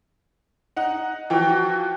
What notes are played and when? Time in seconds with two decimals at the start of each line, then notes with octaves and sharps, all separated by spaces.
0.76 D#4 F#5
1.30 E3 F3 F#4 G5